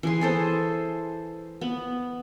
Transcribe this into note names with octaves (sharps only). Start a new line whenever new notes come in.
E3 G#4 C6
G#4 A4 C5
B3